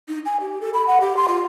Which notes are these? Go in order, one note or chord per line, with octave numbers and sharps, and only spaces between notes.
D#4
G#5
G4
A4
B5
F#5
G4
C6
F4